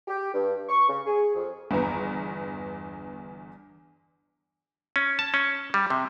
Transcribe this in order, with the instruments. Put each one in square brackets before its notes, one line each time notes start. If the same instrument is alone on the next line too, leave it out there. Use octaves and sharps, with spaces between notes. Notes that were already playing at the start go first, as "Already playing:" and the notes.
[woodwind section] G4
G2
C#6
C#3
G#4
F2
[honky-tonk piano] G1 E2 D3 B3 A#5
[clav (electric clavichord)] C#4
A5
C#4
G3
C3